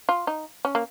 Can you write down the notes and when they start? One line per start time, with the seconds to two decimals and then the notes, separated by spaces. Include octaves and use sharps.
0.09 F4
0.27 D#4
0.65 C#4
0.75 A#3